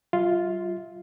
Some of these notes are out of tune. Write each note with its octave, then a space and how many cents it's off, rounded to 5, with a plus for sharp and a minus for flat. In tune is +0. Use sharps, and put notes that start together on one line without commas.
G3 -45 F4 +0 E5 -35